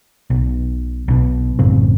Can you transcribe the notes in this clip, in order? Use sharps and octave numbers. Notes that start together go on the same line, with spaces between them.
B1
B1 B2
A1 F#2 C#3 C4